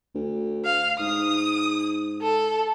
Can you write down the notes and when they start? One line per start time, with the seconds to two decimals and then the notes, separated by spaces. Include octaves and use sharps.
0.15 D2
0.65 F5
1.00 G#2 D#6
2.22 A4